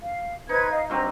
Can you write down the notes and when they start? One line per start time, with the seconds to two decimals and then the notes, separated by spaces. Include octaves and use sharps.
0.02 F5
0.49 D#4 B4 C5 G#6
0.70 D#5 F5
0.90 G2 F#3 C4 A#5